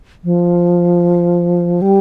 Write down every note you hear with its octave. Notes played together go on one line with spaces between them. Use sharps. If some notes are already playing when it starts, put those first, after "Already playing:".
F3
G3